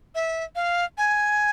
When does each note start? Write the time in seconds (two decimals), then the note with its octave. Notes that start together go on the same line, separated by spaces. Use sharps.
0.15 E5
0.56 F5
0.98 G#5